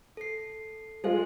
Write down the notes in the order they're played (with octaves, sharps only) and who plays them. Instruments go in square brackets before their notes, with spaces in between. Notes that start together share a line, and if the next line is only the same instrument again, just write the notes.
[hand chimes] A4 C7
[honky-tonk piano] G#3 F4 [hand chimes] A4 C5